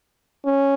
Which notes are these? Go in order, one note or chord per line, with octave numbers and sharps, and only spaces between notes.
C#4